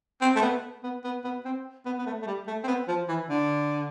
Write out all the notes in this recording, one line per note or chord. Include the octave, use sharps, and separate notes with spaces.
C4
A3
B3
B3
B3
B3
C4
B3
B3
A3
A3
G3
A3
C4
B3
F3
E3
D3